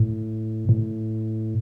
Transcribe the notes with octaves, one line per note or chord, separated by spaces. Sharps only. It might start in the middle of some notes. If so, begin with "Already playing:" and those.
Already playing: A2
A2